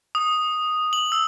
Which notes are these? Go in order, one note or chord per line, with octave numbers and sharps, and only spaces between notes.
D#6
F#7
E6